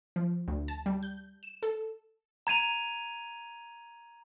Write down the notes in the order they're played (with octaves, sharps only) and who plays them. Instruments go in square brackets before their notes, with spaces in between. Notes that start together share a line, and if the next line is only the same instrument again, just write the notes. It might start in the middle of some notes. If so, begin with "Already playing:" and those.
[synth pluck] F3
D2
A5
G3
G6
E7
A4
[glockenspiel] A#5 G#6 D#7 F7